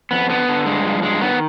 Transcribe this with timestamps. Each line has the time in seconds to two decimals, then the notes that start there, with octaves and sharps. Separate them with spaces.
0.11 F2 B3
0.29 D3 B3
0.48 D3
0.66 G2 G#3
0.84 F3
1.03 G2 G#3
1.21 D#3 B3